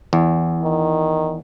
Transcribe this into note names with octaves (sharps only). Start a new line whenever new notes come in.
E2
D#3